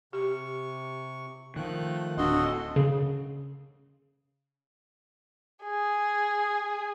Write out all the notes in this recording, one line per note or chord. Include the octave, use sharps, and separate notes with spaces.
C3 G4 C#6
D#3 F3 A3 F#6
D1 D4 F#4 A4 D#5 C6
C#3
G#4